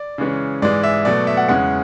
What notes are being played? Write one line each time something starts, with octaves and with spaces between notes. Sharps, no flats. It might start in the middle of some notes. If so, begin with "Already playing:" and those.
Already playing: D5
C#3 E3 G#3 C#4
G#2 E3 G#3 D5
E5
B2 F#3 A3 D5
E5
F#5
E2 C#3 G#3 C#4 F#5